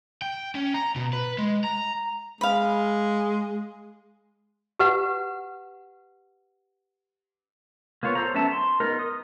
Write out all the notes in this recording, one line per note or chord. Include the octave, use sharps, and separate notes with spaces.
G5
C#4
A#5
B2
B4
G#3
A#5
G#3 F5 B5
G4 B4 F#5
A#3 B3 F4 C#5
A4 C5 A#5
F#3 B3 C#4 E5 A5
C6
B3 D#4 A#4
D#6